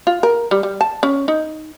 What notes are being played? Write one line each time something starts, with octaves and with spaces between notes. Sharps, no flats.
F4
A#4
G3
G3
A5
C#4
D#4